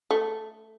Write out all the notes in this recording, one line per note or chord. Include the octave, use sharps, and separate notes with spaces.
A3